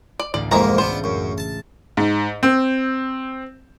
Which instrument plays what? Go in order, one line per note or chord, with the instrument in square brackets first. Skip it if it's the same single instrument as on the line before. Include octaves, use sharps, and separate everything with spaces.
[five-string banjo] D5
[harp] A1 D2 A2 [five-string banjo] D5
[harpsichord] F2 G#2 A#3 [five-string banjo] E3 D#5 A#5
[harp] C#2 A3 [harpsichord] B3 D4 [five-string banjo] C5
[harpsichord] F#2
A5
[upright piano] G#2
C4